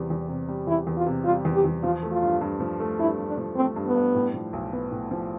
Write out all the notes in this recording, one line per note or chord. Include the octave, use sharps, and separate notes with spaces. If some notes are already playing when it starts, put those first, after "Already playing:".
Already playing: E2 C3 G3
E2
C3
G3
E2 E4
E2
F4
C3
G3 F4
E2
G4
E2
F3 F4
A3
F4
G2
G2
F3
A3
G2 E4
G2
D4
F3
A3 C4
G2
B3
G2
A2
F3
B1
B3
A2
F3